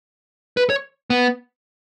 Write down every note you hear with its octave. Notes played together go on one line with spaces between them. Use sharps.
B4
C#5
B3